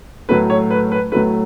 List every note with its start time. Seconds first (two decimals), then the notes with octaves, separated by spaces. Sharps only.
0.29 A2 F#3 A3 B4
0.50 C#5
0.71 B4
0.92 B4
1.12 A2 F#3 A3 B4